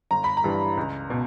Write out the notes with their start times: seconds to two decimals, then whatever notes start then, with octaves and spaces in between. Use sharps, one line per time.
0.11 G1 A#5
0.24 B5
0.37 A#5
0.44 G2 E3 G3
0.77 C#2
1.10 B2